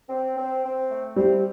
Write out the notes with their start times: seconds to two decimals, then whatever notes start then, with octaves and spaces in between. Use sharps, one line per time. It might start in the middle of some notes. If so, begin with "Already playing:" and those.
0.09 C4
0.37 C4
0.63 C4
0.89 A3
1.16 G3 C4